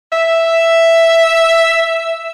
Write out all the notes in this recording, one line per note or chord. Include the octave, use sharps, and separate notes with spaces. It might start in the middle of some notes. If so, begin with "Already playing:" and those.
E5